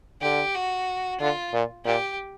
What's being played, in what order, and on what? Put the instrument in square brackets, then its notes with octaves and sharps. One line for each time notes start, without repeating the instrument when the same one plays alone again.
[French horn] D3 [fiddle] G4
[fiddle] F#4
[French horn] D3 [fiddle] F4
[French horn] A#2
[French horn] A#2 [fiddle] G4